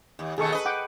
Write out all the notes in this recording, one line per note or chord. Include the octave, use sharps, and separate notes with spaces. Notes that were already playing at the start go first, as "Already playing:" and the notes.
D#2
D#2 B2 D#3 G#4 A4 C#6
B4 D#5
F#5 G5 D6